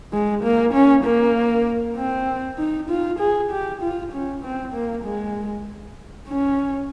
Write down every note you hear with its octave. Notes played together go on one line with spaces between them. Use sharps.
G#3
A#3
C#4
A#3
C4
D#4
F4
G#4
G4
F4
C#4
C4
A#3
G#3
C#4